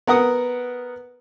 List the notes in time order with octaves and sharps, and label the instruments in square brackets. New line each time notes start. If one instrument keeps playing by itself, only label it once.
[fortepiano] B3 A#4 F#5 D#6